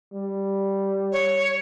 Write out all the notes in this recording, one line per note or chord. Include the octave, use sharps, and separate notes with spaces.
G3
C#5